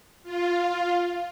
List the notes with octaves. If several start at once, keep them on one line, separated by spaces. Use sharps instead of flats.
F4